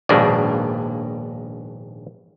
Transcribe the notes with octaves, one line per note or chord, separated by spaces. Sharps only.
A#1 D#2 G#2 B2 A#3 D4